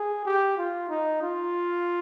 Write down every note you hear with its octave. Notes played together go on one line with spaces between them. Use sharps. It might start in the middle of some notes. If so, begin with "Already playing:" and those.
Already playing: G#4
G4
F4
D#4
F4